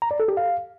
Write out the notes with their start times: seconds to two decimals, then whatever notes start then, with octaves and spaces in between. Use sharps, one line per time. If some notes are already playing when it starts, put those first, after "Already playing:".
0.02 A#5
0.11 D5
0.20 A4
0.28 G4
0.37 F5